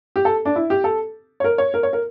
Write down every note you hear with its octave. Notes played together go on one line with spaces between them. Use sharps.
G4
A4
D4
E4
G4
A4
C#5
A#4
C#5
A#4
C#5
A#4